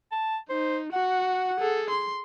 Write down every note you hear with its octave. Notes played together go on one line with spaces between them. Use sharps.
A5
D#4 C5
F#4 F#5
G#4 A4
C6